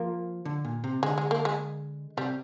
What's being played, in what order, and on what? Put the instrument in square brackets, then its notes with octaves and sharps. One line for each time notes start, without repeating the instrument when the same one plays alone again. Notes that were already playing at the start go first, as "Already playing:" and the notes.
Already playing: [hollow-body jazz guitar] F3 [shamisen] A#3
[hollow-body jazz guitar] D3
A#2
C3
[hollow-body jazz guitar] D3 [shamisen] G#3
[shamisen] G#3
A#3
G#3
[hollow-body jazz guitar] C3 [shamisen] G3